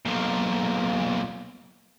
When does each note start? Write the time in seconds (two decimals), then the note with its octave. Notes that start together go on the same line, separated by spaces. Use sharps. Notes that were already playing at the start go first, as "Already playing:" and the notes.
0.06 B1 A#2